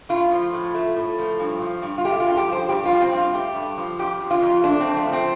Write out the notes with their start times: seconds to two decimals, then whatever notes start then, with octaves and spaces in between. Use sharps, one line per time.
0.09 A2 F4
0.31 F3
0.54 A2
0.74 A3
0.97 A2
1.18 F3
1.39 G2
1.61 F3
1.82 G2
1.98 F4
2.04 A3 G4
2.20 F4
2.25 G2
2.37 G4
2.47 F3
2.52 C5
2.69 G2 G4
2.85 F4
2.91 F3
3.01 C4
3.12 G2
3.17 F4
3.34 A3 G4
3.55 G2
3.77 F3
3.99 F2 G4
4.20 F3
4.31 F4
4.42 F2
4.63 A3 D4
4.80 C4
4.86 F2
4.97 A3
5.07 F3
5.13 C4